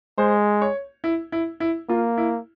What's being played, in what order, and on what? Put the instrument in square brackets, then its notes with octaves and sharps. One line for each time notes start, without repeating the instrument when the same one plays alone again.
[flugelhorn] G#3 [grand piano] C5
[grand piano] C#5
E4
E4
E4
[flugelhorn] A#3 [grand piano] F4
[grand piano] E4